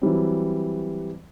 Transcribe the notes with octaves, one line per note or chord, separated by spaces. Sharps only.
E3 F#3 G3 C4